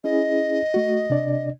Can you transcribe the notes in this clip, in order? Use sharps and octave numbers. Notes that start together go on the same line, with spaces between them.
C#4 E4 G#4 D#5
A3 F#4
C3 D4 D5